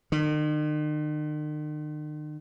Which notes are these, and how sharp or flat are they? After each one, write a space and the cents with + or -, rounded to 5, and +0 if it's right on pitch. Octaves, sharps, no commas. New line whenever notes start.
D#3 -45